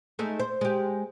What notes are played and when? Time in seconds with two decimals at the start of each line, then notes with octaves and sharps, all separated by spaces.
0.19 G#3 A3 D#4
0.40 C5
0.61 G#3 G4